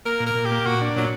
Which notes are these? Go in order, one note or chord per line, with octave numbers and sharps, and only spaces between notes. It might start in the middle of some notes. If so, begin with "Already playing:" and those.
A#3 A#4
A#2
A#4
A#2
G4
A#3
A#2 F#4
D4
A#2 F#3